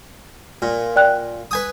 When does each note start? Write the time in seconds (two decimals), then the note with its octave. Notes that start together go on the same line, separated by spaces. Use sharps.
0.62 A#2
0.96 D5 G5 F#6
1.51 B4 G#5 D#6